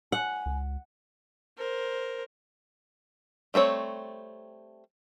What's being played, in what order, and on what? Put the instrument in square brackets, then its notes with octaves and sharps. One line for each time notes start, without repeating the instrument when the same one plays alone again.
[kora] F#5 [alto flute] G#5
[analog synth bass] C#2
[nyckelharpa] A#4 C5
[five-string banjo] G3 A3 C4 C#5